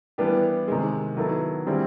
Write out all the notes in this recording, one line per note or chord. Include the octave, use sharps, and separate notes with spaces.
E3 G3 B3 D4 G4
C3 D#3 G#3
D#3 F#3 B3 E4 A4
D3 G3 C4 E4 G#4